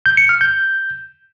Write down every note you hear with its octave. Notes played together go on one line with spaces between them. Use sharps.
G6
C#7
F6
G6